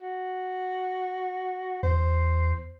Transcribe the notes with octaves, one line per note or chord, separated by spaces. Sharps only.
F#4
E2 C5